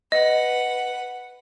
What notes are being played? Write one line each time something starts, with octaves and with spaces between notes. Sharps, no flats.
B4 D#5 F#5